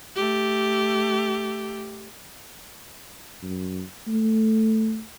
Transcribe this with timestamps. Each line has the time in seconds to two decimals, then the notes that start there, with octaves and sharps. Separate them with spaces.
0.16 A3 G4
3.43 F#2
4.07 A3